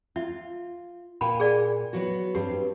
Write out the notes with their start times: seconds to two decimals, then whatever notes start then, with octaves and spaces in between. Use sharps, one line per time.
0.16 F4 E5
1.21 A#2 G5 G#5 B5
1.40 G#4 D5 F5
1.93 F#3 B3 F#4
2.35 G2 C4 G4